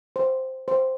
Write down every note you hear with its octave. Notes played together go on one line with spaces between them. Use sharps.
C5
C5